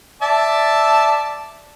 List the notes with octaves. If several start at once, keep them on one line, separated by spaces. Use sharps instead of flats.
D5 E5 A5